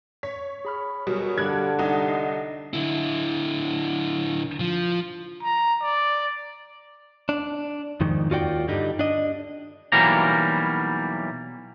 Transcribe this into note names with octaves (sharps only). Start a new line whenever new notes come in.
C#5 B6
G#4 B5 F6
B2 F#3 G3 G#4 A#4
G2 D3 G4 F#6 G#6
C2 D#4 F#5
D#5 C7
D3 E4
F3
A#5
D5
D4
F2 G#2 D#3
D#2 F4 F#4 D5 G5
G2 D3 G3 D#4
D4 D#5
B1 E3 F#3 G3 A#3 A#5